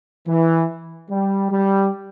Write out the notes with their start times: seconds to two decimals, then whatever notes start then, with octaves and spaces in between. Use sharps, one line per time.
0.27 E3
1.10 G3
1.51 G3